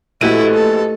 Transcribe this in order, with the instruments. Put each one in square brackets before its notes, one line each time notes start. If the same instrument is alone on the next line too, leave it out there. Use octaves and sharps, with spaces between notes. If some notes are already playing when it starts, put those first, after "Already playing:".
[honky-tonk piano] A#1 F#4 D#7 [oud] A3 [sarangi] E4 [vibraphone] G4 B4 D#5
[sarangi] A4